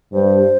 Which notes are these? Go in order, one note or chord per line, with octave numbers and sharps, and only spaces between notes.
G2 C5